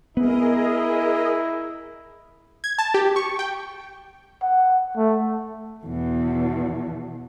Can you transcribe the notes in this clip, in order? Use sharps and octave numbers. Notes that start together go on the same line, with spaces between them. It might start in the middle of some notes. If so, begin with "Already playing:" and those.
B3 E4 G#4 A#4 D#5
G#6
A5
G4
C#6
G5
F#5
A3
E2 B2